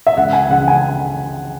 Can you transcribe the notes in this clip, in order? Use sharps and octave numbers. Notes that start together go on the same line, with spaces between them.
E5
C#2 F#5
G#5
C#3 F#5
G#5